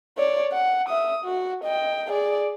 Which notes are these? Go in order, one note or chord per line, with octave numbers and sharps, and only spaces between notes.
C#5 D5
F#5
E5 D#6
F#4
D#5 G5
G#4 D5